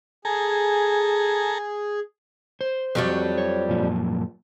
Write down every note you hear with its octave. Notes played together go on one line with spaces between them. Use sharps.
G#4 A4 G#5 A#5
C5
F2 F#3 G3
C#5
F#2 A#2 F3